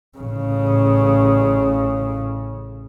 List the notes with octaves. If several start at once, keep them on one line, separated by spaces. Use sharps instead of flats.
A1 C#3